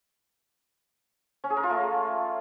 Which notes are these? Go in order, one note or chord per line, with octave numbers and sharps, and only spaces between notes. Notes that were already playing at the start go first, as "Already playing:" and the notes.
C#4
G#4
A#4
F4
A3